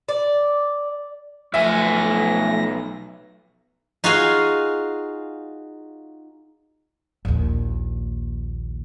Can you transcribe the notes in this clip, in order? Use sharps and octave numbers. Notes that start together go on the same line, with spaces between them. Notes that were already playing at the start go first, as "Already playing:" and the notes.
D5
B1 F3 A3 E5 G#5 A#6
D#4 F4 F#4 G#4 F5 G#5
A#1 D#2